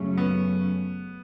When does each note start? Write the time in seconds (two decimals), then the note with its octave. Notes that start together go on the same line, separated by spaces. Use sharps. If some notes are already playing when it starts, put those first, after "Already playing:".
Already playing: F#2 C#3 F#3 A3 C#4
0.18 B3